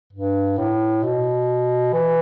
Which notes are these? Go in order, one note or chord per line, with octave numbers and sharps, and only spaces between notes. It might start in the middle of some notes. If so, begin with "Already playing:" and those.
G2
A2
B2
E3